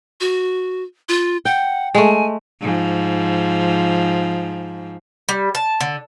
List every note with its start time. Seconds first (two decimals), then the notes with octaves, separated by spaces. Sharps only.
0.21 F#4
1.09 F4
1.45 F#5 G5
1.95 G#3 A3 G#5
2.61 G#2 F3
5.29 G3
5.55 A5
5.81 D3